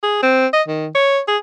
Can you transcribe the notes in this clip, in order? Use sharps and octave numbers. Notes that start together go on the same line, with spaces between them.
G#4
C4
D#5
D#3
C#5
G#4